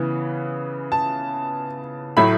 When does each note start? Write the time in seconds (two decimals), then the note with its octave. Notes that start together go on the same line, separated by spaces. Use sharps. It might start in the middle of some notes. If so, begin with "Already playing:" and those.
Already playing: C#3 E3 B3
0.92 A5
2.17 A2 F#3 A3 E4 B5